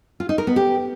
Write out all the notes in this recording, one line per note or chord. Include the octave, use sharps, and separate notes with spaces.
F4
D#4
A#4
B3
G4